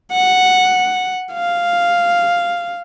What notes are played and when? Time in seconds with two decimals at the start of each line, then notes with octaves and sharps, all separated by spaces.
0.12 F#5
1.33 F5